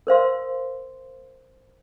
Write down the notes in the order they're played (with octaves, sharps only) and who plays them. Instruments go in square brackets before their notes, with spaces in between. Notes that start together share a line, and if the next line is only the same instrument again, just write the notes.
[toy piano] A#4 C5 F5 C6